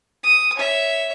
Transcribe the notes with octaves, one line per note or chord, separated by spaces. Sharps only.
D#6
C#5 E5